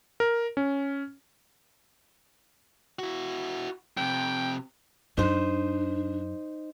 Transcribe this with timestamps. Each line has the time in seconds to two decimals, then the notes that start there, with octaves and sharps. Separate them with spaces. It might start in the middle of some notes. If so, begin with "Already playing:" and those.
0.20 A#4
0.57 C#4
2.99 E4 F#4
3.97 F2 C3 G5
5.17 F#2 D4 D#4 C5